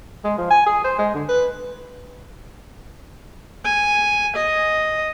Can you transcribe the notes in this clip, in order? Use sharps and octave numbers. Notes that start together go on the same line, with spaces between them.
G#3
F3
G#5
G#4
C5
G#3
D3
B4
G#5
D#5